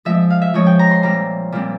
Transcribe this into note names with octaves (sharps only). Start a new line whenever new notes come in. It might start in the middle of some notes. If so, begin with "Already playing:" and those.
F3 G#3 C4 E5
F5
E5
F3 G#3 C4 C#5
G5
A#5
C6
A#2 G3 C4 A#5
A#2 G3 C4